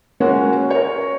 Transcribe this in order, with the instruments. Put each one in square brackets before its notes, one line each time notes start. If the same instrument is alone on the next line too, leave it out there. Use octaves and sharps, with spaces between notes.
[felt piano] G#3 A#3 C#4 F#4
A#4 C#5